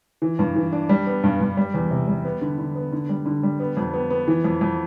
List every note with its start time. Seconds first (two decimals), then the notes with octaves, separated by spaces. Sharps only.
0.22 E3
0.39 G2
0.56 E3
0.73 D4
0.89 G3
1.07 B3
1.24 G2
1.40 G2
1.57 G3
1.74 E2
1.91 C3
2.07 G3
2.25 B3
2.41 D3
2.58 D3
2.75 B3
2.93 D3
3.09 G3
3.26 D3
3.43 G3
3.60 B3
3.77 F2
3.94 B3
4.10 B3
4.28 E3
4.45 F2
4.61 F2